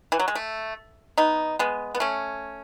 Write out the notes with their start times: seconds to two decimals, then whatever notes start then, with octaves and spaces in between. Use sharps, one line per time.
0.12 E3
0.20 F#3
0.28 G#3
0.35 A3
1.18 B3 D#4
1.59 G#3 B3
1.95 B3
2.00 A3 C#4